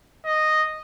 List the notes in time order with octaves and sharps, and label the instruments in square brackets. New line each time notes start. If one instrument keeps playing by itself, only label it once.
[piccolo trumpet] D#5